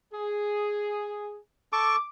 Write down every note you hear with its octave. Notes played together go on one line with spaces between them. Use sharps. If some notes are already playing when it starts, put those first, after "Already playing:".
G#4
A4 A5 C#6 D6